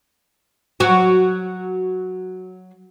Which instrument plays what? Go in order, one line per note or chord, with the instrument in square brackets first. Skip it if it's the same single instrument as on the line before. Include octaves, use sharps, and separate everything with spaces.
[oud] F#3 F#4